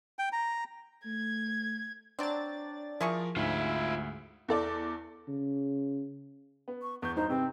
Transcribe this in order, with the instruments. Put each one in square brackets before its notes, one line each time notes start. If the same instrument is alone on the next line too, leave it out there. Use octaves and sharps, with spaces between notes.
[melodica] G5
A#5
[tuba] A3 [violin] G#6
[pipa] F#3 C4 [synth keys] D4 D5 A6
[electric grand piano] F3 A#4 [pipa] E4 G#4 C#6
[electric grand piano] D2 [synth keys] G#2 [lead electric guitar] F4 E5
[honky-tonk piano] E2 A4 D5
[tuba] C#3
[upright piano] B3
[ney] C#6
[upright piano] E2 G6 [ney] C#6
[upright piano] G2 [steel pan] D#4 [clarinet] C5 [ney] A#5
[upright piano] C3 [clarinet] C4 [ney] B4